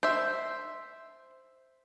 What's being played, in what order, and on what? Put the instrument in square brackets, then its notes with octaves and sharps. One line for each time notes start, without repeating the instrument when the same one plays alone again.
[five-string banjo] C5 E5